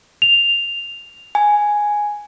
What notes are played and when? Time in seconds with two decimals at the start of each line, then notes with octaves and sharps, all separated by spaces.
0.22 F7
1.35 G#5